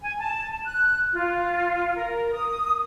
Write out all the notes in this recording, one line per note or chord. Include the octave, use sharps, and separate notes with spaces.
G#5
A5
F#6
F4
A#4
D#6